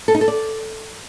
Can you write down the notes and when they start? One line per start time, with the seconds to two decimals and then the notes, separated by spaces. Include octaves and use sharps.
0.08 A4
0.15 D#4
0.21 A4
0.28 D5